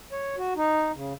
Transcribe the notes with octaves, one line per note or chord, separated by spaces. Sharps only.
C#5
F#4
D#4
C#3